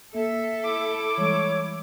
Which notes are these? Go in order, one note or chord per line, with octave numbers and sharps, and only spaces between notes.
A#3 A4 E5
E4 D6
E3 G3 G#3 C#5